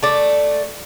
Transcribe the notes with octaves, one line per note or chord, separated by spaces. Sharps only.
A3 D5